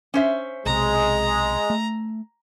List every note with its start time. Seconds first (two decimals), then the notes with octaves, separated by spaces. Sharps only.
0.14 C#4 C5 E5
0.66 B1 C3 G#3 A#5
1.70 A3